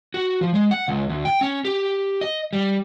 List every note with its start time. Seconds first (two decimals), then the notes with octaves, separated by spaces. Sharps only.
0.14 F#4
0.41 F3
0.54 G#3
0.71 F#5
0.88 C#2
1.09 D2
1.25 G5
1.41 C#4
1.65 G4
2.21 D#5
2.53 G3